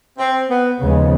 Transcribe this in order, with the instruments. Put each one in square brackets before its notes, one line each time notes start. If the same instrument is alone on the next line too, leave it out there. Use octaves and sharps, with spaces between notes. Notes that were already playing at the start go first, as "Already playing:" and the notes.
[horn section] C4
B3
[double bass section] D#2 C#3 F3 G#3 B3